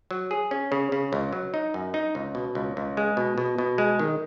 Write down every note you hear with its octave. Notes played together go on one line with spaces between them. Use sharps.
F#3
G#4
C#4
C#3
C#3
C#2
F#3
D#4
F#2
D#4
C#2
B2
C#2
C#2
G#3
B2
B2
B2
G#3
D#3